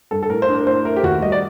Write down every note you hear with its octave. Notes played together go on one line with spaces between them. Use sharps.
G2 A4
A4
A2 A#4
C5
D4
A#4
A2 C5
A3 A#4
G4
D#2 F#4
G3 D#5
D5